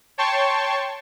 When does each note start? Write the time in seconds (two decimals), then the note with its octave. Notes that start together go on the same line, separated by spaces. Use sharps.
0.18 C#5 G5 A5 C6 C#6